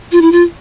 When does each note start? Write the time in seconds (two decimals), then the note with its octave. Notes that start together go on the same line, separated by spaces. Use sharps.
0.12 F4
0.22 E4
0.32 F4